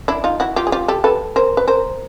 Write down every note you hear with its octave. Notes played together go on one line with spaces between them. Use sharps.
D4 E4
D#4 F4
E4 F#4
F4 G4
G#4
F4 G4
G4 A4
A4 B4
A#4 C5
B4
A#4 C5